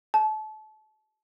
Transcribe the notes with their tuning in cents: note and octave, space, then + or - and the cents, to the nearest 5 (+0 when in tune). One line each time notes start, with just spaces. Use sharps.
A5 -30